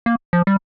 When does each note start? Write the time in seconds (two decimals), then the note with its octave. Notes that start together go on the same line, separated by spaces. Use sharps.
0.06 A#3
0.33 F3
0.47 G3